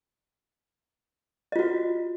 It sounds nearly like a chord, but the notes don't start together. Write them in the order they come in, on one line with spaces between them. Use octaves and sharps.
D#5 F4 F#4